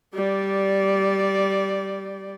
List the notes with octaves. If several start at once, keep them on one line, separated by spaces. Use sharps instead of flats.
G3 D5